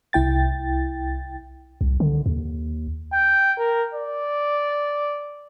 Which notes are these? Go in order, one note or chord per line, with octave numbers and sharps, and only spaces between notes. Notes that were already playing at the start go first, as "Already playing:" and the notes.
C2 E4 G5 A6
C2
D3
D#2
G5
A#4
D5